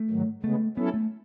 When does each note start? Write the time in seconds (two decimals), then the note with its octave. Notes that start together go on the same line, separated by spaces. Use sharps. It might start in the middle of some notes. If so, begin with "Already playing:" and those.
Already playing: A3
0.10 G#2 D#3 F#3
0.43 C#3 G#3 A3 B3
0.76 F#3 B3 C#4 E4 A4
0.94 A3